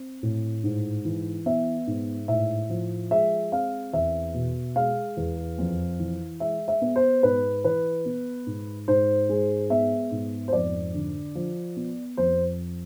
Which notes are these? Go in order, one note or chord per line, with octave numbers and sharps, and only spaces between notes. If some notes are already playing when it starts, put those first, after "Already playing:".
Already playing: C4
A2
G#2
E3
B3 E5
G#2
A2 E5
F3
G#3 E5
C4 F5
E2 E5
B2
G#3 F5
E2
F2
E3
G#3 E5
E5
B3
C5
G#2 B4
E3 B4
B3
G#2
G#2 C5
G#3
B3 E5
G#2
C5
F2 D5
D3
F3
B3
F2 C5